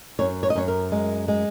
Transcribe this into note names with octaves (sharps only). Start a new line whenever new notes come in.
F#2 C#5
C#5
D#5
F#2 C#5
A#4
G#3
G#3